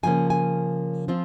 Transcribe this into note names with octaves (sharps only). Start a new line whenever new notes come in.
C#3 F3 A#3 C#4 G#5
G#5
F3 C4 F4